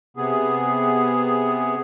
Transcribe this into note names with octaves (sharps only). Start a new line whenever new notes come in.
C3 B3 G#4